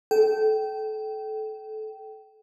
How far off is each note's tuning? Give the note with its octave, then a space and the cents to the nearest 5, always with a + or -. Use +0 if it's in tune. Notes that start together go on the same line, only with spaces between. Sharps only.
A4 -25 G5 -20